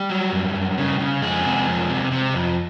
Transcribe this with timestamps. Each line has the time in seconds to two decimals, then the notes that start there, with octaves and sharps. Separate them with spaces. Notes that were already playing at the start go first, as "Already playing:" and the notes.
Already playing: G3 G4
0.10 F#3
0.32 F#2
0.55 F#2
0.78 C#3
0.99 C#3
1.22 F2 G#3 G#4
1.45 C3
1.67 F2
1.89 C3
2.12 C3
2.34 F2